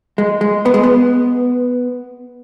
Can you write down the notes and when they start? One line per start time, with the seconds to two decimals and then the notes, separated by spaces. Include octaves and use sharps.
0.18 G#3
0.41 G#3
0.66 B3
0.74 G#3
0.83 B3